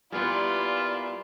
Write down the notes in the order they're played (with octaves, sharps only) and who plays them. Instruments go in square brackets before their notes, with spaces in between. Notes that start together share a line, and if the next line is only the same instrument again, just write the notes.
[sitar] A#2 [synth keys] G3 B3 [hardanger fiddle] E4 D5 [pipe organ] F4